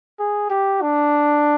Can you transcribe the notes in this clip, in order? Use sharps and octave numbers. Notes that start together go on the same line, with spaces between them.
G#4
G4
D4